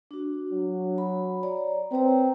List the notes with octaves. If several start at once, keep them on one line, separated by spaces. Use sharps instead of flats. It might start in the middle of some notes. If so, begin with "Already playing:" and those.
D4 F#4
F#3
B5
C#5 D5 A#5
C4 B4 C#5 A#5